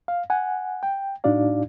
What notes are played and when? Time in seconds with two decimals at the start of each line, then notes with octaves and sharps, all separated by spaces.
0.08 F5
0.30 F#5 G#5
0.83 G5
1.24 A2 D4 D#4 F#4 D5 F5